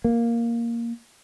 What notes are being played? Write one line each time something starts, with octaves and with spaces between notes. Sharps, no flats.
A#3